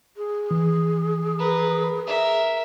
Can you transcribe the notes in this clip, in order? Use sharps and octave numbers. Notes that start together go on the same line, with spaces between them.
G#4
E3
A#4 B4
A#4 E5